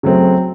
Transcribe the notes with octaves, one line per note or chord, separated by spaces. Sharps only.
C#3 F#3 A3 C4